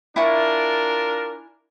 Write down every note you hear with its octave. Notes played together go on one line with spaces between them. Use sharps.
D4 E4 F4 A#4 G#5 C#6